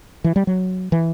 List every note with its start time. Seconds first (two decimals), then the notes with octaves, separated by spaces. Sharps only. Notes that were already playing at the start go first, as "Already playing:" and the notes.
0.24 E3
0.36 G3
0.47 F#3
0.92 E3